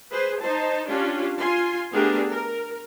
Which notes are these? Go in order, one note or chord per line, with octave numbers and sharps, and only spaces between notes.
G#4 B4 C5
D#4 C5 A5
C#4 D4 F4 G4
F4 G#5 C6
A3 B3 D4 G4 G#4 A#4
A#4